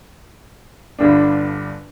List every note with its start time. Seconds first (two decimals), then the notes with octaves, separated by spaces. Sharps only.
0.99 G1 G2 D3 G3 D4